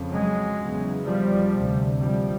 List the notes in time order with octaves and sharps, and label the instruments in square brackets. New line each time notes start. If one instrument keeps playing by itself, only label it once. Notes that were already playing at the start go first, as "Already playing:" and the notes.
Already playing: [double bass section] F2 C#3
F#3 G#3
E2 C#3
F3 G3
D2 C3
F3 G3